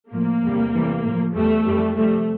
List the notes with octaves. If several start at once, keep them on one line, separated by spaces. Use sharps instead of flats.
A2 F3 A#3
E2 C3 G3
E2 C3 E3 G3
A2 F3
E2 E3 G3 A3
F2 E3 G3
F2 C3 G3 A3